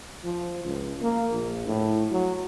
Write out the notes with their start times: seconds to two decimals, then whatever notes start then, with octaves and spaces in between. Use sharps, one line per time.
0.24 F3
0.65 C#2
1.02 A#3
1.32 A#1
1.67 A2
2.12 F#3